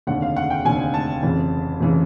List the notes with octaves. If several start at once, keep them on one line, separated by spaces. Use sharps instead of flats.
F1 D#2 D3 F#5
F5
F#5
G5
F1 D#2 D3 G#5
A5
F1 F2 C#3 E3
F1 C#3 E3